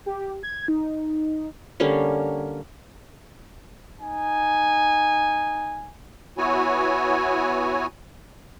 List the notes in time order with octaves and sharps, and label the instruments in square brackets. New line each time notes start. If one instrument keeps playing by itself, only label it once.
[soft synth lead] G4
G#6
D#4
[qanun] D3 G3 A#3 C#4
[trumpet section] D#4 G#5
[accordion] B3 E4 F#4 C#5 G#5